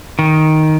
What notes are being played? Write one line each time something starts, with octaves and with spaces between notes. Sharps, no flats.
D#3